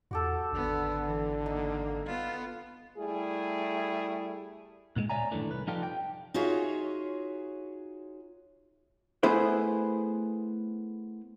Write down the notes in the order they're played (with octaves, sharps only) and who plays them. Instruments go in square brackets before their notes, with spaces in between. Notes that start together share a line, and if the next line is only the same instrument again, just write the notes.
[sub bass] E2 [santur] F#4 G4 A4
[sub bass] G#1 [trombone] D3 [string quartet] B3
[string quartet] E3
[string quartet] A#3 [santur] D#4
[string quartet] B3 F4
[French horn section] G3 A3 E4 G#4
[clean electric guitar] A#2 D#3 G#3
C#5 D5 E5 G#5 A#5
F#2 A2 D#3 E3 A3 D4
C2 B4
F3 D#4 F4 G4 A4 D5
G5
[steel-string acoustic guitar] D#4 F4 F#4 G#4 C#5 E5
[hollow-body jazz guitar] A3 B3 E4 G#4 C5